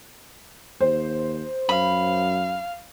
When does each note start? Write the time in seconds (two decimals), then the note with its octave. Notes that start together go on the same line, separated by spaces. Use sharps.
0.81 D#2 C5
1.69 F#2 F5 B5